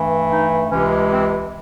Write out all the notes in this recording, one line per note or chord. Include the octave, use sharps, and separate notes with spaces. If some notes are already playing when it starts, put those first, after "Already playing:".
Already playing: G2 E3 A3
D#4
C#2 C3 E3 G#3 C#4
C4